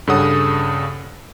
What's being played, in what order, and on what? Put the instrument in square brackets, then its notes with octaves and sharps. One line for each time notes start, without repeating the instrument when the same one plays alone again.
[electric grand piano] G2 C#3 A4 C#5 F#5 D#6